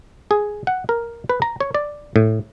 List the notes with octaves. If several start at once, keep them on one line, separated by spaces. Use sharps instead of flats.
G#4
F#5
A#4
B4
A#5
C#5
D5
A2